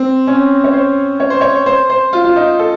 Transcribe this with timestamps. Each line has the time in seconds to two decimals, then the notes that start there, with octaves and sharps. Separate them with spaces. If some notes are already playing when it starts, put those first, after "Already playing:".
Already playing: C4
0.27 C#4
0.64 C#5
0.73 C5
1.20 C#5
1.30 C5
1.41 C#5
1.66 C5
1.90 C5
2.13 F4
2.25 F4
2.36 D#4
2.59 A4